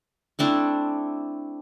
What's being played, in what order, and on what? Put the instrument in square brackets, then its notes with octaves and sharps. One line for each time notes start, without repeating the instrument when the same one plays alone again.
[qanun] A3 C4 D4 E4